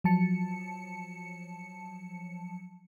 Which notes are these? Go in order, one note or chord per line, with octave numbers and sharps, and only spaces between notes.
F3 F#3 A5 C#7